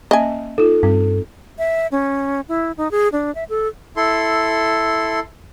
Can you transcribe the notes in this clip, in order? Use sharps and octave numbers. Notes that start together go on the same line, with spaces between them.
A#3 C#4 D#5 E5 G#5
D#4 F4 A4
G2 C4
E5
C#4
E4
D#4
G#4
D4
E5
A4
E4 A4 C6